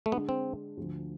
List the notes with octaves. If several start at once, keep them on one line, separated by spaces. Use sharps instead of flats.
A3
D3 G#3 B3 D4
C4
D2 D3 F3